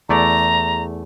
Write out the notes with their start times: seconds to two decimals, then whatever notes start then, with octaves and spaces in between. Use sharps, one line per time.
0.09 E2 A3 D5 A#5